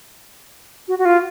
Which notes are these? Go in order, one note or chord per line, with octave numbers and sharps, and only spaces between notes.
F#4
F#4
F4